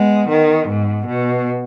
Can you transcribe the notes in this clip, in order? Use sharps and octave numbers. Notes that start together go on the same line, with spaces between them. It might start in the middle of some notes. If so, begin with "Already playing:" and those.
Already playing: G#3 B3
D#3
G#2
B2